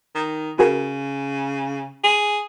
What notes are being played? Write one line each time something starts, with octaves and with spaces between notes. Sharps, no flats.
D#3
C#3 F#4 G#4 A#4
G#4